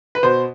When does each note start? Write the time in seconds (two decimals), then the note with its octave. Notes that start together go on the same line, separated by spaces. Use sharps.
0.15 B4
0.23 B2 C5